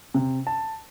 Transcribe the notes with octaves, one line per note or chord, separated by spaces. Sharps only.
C3
A5